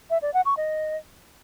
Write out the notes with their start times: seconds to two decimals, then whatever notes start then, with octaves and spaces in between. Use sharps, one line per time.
0.10 E5
0.22 D5
0.34 F#5
0.45 C#6
0.57 D#5